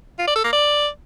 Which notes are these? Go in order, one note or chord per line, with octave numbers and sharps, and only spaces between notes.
F4
D5
A4
A#3
D5